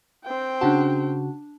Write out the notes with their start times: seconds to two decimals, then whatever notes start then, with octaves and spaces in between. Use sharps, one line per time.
0.25 C4 G5
0.61 C#3 D4 F#4 A5